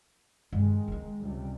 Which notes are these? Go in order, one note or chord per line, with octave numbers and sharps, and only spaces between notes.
G2 D#3 G#3
B3 D#4
C#2 C3 G3